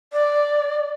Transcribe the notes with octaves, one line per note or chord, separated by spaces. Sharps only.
D5